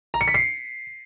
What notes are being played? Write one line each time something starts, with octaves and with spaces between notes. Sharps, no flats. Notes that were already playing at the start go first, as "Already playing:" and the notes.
A#5
C#7
B6
C7